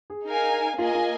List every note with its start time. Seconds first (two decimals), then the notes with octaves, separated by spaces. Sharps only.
0.10 G#4
0.27 D#4 A#4 F5 G#5
0.78 A#3 F4 G#4 D#5 G#5
0.95 F4